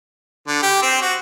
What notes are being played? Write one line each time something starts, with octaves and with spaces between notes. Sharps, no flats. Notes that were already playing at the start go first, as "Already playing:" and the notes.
D3
G4
C4
F#4